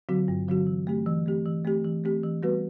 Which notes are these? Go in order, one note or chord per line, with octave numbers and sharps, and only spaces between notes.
D3 F#3 C4 F#4
G2
D3 F#3 C4 F#4
E3
A3 C4 G4
E3
A3 C4 G4
E3
A3 C4 G4
E3
A3 C4 G4
E3
G3 B3 F#4 B4